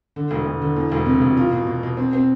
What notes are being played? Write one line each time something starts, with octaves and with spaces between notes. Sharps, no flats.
D3
E1
E1
D3
E2
E1
C3
E1
F4
B2
B2
B2
C4
C4